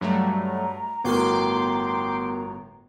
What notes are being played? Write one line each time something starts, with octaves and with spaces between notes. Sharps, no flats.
G2 F#3 G3 A3 A#5
G1 A2 B3 F#4 A#4 G5 C6 D6